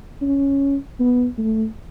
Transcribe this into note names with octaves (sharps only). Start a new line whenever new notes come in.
C#4
B3
A3